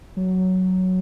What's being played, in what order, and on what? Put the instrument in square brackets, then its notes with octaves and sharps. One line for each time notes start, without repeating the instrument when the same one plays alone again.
[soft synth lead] F#3